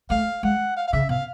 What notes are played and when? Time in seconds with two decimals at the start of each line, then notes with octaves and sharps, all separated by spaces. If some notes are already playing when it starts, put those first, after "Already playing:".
0.10 A3 F5
0.43 G#3 F#5
0.77 F5
0.87 F5
0.92 C#3 E5
1.09 B2 F5